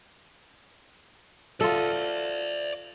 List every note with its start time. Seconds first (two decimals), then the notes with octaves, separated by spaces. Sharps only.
1.61 F4 A4 D5 E5